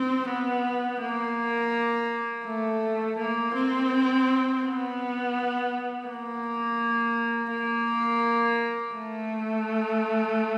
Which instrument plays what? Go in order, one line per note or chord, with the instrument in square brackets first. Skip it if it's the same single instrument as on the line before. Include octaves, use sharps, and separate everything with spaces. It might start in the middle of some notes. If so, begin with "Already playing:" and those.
Already playing: [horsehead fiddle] C4
B3
A#3
A3
A#3
C4
B3
A#3
A#3
A3